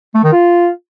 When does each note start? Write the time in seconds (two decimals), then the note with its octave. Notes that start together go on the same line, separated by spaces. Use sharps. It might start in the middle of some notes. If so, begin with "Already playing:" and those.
0.14 A3
0.23 D#3
0.32 F4